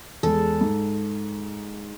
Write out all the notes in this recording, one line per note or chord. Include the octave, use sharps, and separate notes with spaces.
E2 G#3 A4
G#2